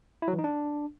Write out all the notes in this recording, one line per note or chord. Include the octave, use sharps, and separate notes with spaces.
E4
F#3
E3
D#4
D4